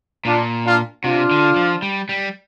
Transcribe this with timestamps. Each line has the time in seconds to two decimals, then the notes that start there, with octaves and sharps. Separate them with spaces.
0.25 A#2 D4 F4
0.64 D4 F4
1.04 C3 D4 F4
1.31 D3
1.56 F3
1.82 G3
2.09 G3